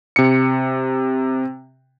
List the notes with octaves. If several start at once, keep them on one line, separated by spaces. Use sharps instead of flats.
C3 C#7